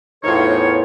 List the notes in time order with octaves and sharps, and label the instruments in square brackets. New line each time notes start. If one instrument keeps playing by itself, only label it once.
[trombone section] E2 A2 [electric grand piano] D#4 F4 [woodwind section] A#4 C5 C#5